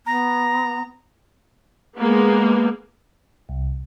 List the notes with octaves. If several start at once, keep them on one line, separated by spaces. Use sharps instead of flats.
B3 A#5
G#3 A#3 B3
C2